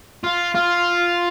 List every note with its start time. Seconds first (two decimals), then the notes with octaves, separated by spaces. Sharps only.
0.24 F4
0.55 F4